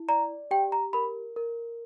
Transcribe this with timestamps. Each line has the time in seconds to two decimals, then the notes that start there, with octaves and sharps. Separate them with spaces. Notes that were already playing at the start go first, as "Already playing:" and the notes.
Already playing: E4
0.09 D5 A#5
0.51 G4 G5
0.72 A#5
0.93 A#4 B5
1.36 A#4